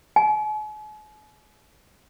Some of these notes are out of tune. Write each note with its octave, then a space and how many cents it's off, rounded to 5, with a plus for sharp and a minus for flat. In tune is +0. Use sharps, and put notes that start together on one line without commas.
G#5 +45